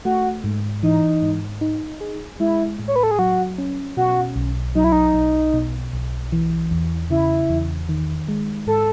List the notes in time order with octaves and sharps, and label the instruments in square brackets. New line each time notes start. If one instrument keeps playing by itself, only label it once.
[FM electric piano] A3 [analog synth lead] F#4
[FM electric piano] G#2
[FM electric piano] E3 [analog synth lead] D#4
[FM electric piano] G#2
D#4
G#4
[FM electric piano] G#3 [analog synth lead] E4
[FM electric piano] A2
[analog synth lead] C#5
B4
A4
G#4
[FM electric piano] F#3 [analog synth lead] F#4
[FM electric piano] C#4
[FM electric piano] B2 [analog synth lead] F#4
[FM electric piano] B1
[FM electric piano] F#3 [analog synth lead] D#4
[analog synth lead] E4
D#4
[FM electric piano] B1
B2
B1
E3
E2
[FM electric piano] C#3 [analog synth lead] E4
[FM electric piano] E2
D#3
G#3
[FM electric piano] G#2 [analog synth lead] A4